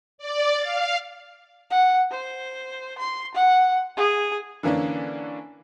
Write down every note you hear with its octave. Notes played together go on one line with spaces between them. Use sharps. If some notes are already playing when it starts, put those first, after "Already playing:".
D5
F5
F#5
C5
C6
F#5
G#4
D3 E3 A#3 C#4 D4